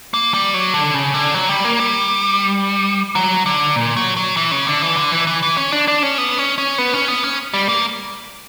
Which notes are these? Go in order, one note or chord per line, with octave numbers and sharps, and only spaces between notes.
A#3
G3
F#3
D3
C#3
D3
F#3
G3
A#3
G3
F#3
D3
A#2
F#3
F#3
E3
C#3
D3
E3
D3
E3
E3
E3
C#4
D4
D4
C#4
B3
C#4
C#4
B3
C#4
B3
C#4
G3
A#3